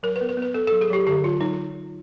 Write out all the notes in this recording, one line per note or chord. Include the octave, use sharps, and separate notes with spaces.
F#3 A#4
B4
B3
B4
B3
B4
B3 A4
F#3 A4
G#4
F#3 G4
D3 G4
F#3 F4
F#3 D#4